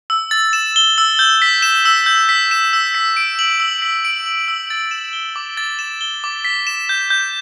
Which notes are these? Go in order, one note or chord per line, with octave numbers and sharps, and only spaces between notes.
E6
A6
E7
G7
E6
G6
B6
E7
E6
G6
B6
E7
E6
B6
D7
F#7
E6
B6
D7
F#7
E6
A6
E7
G7
D6
A6
E7
G7
D6
B6
E7
G6
G6